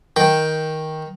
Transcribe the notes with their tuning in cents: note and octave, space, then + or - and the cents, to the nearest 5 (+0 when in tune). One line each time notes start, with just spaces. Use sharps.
D#3 +10 G5 +0